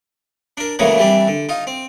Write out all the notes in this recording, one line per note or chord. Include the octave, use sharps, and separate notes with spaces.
D4 A#4
A2 C#3 E3 F#3 G#3 A#3
E3 G3 C4 D4
D3
D#4 F4
C4